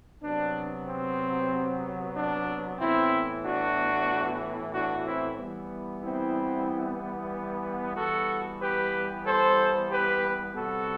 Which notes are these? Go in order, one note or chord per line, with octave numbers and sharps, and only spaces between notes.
C3 F#3 B3 D4
C4
D4
A2 E3 B3 C4 E4
D4 F#4
D4 F#4
C4 E4
E3 G3 B3
C4 E4
E3 G3 B3 F#4 A4
G4 B4
A4 C5
G4 B4
C3 G3 B3 F#4 A4